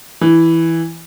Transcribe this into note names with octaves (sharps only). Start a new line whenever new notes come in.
E3